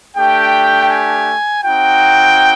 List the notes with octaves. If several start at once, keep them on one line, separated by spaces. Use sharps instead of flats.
A3 D4 G4 G5
G#5
C4 D#4 F#4 G5